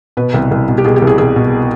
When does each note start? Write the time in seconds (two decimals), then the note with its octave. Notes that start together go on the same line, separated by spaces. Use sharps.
0.17 B2 B4
0.34 C2
0.51 C2
0.68 B2
0.78 G4
0.85 B2 G#4
0.96 G4
1.02 C2
1.07 G#4
1.18 C2 G#4
1.36 B2